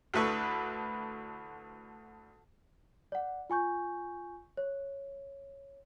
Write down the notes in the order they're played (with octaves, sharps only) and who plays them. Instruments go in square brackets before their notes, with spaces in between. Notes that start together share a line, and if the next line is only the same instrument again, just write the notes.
[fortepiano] D2 D3 E4 B4 B5 C#6
[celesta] D5 F#5
F4 G#5 C#6 G6
C#5